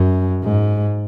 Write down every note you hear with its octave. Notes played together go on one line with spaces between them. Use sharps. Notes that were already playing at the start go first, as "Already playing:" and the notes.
Already playing: F#2
G#2